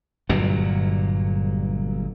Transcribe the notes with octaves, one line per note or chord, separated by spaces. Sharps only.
G1 G2 A#2 F#3